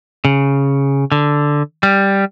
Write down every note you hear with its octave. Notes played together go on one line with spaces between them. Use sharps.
C#3
D3
G3